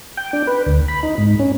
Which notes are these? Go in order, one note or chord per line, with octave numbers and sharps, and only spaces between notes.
G5
D4
B4
D2
B5
D#4
G#2
C#4